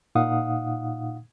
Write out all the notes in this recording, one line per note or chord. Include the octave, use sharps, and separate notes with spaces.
A#2 D#4 F5 F#5 D#6